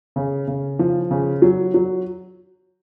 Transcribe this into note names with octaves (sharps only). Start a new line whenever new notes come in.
C#3
C#3
F3
C#3
F#3
F#3